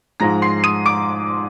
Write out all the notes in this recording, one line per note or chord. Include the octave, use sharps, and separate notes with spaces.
G#2 F3 G#3 A#5 A#6
C6 C7
D#6 D#7
D6 D7